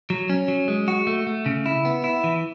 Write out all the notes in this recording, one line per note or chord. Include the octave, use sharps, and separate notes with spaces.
F#3
C#4
F#3
G#3
F#4
A3
A3
C#3
E4
B3
E4
E3